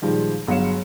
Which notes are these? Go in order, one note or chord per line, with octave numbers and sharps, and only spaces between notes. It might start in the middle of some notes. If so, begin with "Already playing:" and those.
A#2 D#3 F3 G3 G#3
G1 F#3 G#3 F5 C#7 E7